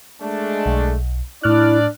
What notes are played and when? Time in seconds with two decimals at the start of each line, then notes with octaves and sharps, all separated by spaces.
0.21 G#3 A3 D4
0.66 B1
1.43 A2 D4 E4 D5 F6 F#6